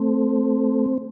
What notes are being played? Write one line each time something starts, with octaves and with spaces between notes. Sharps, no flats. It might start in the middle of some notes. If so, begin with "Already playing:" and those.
Already playing: A3 C4